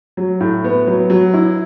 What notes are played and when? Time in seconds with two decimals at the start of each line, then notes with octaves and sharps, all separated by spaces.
0.17 F#3
0.40 A2
0.64 B3
0.87 F#3
1.10 F#3
1.34 E4